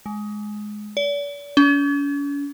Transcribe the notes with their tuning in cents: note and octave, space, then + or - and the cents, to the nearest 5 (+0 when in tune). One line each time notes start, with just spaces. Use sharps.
G#3 +15
D5 -40
C#4 +45